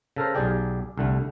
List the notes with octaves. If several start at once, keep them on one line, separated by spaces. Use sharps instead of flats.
C#3 A4 A#4 C5
B1 G4 G#4 D5 G5
C2 D3 A3